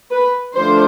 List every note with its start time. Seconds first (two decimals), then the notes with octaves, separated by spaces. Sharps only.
0.12 B4
0.56 D3 F3 A3 D4 F4 C5